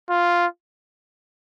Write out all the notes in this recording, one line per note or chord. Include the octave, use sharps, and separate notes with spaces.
F4